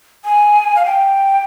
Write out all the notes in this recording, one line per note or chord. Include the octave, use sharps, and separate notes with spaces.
G#5
F5
G5